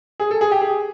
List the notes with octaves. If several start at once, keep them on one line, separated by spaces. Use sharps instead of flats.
G#4
A4
G#4
G4
G#4